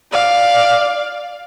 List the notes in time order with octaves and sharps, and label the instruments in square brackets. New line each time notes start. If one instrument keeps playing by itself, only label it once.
[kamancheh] D5 F5